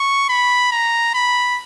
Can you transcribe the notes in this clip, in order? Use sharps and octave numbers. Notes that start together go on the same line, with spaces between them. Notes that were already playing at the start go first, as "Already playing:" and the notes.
Already playing: C#6
B5
A#5
B5